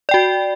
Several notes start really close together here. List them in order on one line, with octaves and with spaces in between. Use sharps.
D5 G5 F#4